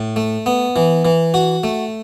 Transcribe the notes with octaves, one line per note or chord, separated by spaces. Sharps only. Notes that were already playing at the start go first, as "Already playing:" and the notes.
Already playing: A2
A3
B3
E3
E3
F#4
A3